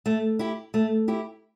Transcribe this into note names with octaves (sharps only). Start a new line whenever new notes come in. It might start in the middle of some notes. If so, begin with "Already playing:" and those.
A3
E4 G4
A3
E4 G4